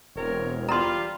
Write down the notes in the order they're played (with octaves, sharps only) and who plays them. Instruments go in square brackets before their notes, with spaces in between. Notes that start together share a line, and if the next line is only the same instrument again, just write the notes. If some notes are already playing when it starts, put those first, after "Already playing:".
[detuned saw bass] E1 [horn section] C4 A#4 C#5
[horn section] G3 F4 [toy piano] A#5 C6